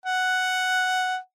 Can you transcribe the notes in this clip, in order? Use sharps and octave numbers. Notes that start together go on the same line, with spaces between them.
F#5